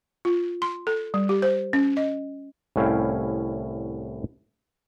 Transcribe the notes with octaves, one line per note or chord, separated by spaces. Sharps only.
F4
C6
A4
G3
G4
C5
C#4
D#5
C2 A2 C#4 E4 F5 G5